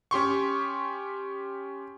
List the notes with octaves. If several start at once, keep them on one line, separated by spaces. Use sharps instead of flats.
C#4 G4 C6 C#6